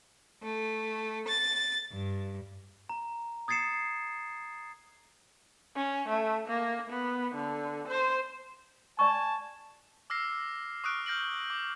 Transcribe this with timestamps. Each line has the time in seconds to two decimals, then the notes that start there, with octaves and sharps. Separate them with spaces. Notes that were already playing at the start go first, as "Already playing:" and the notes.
0.43 A3
1.28 A6
1.92 G2
2.89 A#5
3.48 D#6 G#6 A6 C7 C#7 E7
5.75 C#4
6.09 A3
6.49 A#3
6.90 B3
7.35 D3
7.88 C5
8.99 D5 G#5 A5 C#6
10.10 D6 E6 F6 A#6 C7
10.84 C#6 D#6 F6 F#6 D7
11.06 F6 G6 A#6 D7 F#7
11.50 D6